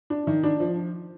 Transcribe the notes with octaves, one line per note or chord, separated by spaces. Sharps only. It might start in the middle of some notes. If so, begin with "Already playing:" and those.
D4
D#3
D4
F3